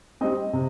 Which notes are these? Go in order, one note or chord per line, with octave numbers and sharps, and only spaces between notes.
G3 C4 D#5
C3